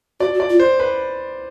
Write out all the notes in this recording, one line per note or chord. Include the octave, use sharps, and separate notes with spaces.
F#4 D5
F#4
D5
F4
C5
B4